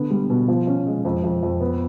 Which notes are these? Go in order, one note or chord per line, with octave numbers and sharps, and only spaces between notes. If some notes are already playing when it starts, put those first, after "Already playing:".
Already playing: D3 B3
G3
B2
F3
C#4
G#3
F2
F2
F2
B3